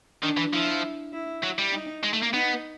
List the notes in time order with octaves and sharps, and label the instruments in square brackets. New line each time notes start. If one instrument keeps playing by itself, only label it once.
[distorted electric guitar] D#3 [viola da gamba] D4
[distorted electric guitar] E3
[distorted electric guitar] F3 [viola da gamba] E4
[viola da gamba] E4
[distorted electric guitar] F#3
G3
[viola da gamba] D#4
[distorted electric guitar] G#3
A3
A#3
[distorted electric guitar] B3 [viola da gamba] D#4